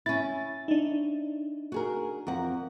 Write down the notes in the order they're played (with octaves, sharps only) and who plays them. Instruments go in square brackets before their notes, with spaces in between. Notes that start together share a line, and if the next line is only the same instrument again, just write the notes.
[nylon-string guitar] C#4 E4 [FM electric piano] A6
[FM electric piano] D4 D#4
[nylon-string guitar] F#4 G#4 A#4
F2 A#4 F#5